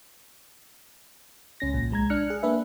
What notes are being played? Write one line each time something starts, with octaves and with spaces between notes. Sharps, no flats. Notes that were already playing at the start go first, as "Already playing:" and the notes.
C#2 C#4 A#6
A#1 A#2
C2 G#3 A#5 G#6
D4 F6 F#6 C#7
G#4 F#6
A#3 D4 B4 E5